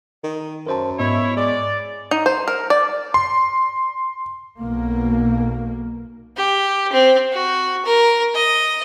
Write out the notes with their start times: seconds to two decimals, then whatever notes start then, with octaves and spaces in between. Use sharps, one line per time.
0.24 D#3
0.67 F#2 A#4 C5 A5
0.99 G#2 B3 E4 C#5 D#5
1.36 G#3 D5
2.11 D#4
2.26 C5
2.48 A#4
2.70 D5
3.14 C6
4.59 B1 B2 A#3
6.37 G4
6.92 C4
7.32 F#4
7.85 A#4
8.34 D#5